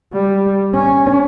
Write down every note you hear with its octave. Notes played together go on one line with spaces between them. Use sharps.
G3
C#4